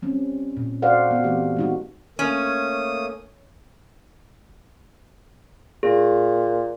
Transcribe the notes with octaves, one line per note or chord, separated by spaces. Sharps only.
G3 C4 C#4
A#2
F#4 A4 C5 D5 F5 F#5
B3 F#4
E3 A3 C4 G4
G#3 D#4 F#4
A3 A#3 C#4 D#6
A#2 G#4